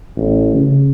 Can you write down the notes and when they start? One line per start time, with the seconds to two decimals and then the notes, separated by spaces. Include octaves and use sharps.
0.16 A1
0.55 C#3